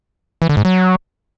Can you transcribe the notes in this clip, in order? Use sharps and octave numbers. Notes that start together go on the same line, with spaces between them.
E3
D3
G#2
F#3